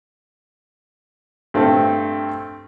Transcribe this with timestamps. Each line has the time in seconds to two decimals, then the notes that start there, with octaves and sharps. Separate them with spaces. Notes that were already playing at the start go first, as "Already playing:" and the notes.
1.54 G2 A3 C4